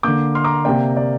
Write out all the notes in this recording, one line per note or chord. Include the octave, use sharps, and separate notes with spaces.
D3 A#3 D6 G6
C6 F6
A#5 D6
C3 A#3 D5 G5
D5